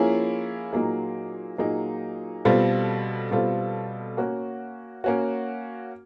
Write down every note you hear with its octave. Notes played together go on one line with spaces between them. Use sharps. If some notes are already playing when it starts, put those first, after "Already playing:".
Already playing: F3 A#3 C#4 E4 G#4
A#2 F#3 A#3 D#4 G#4
A#2 F#3 A#3 D#4 G#4
B2 G3 C4 F4 A4
B2 G3 C4 F4 A4
A#3 C#4 F#4
A#3 C#4 F#4